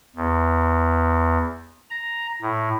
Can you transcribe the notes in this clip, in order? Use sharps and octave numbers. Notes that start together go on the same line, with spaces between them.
E2
A#5
A2